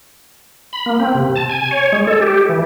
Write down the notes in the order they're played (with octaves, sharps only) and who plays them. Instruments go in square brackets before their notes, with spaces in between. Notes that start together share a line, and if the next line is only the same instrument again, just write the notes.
[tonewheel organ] B5
A#3
C4
C3
A5
G#5
C#5
G#3
A4
G4
E3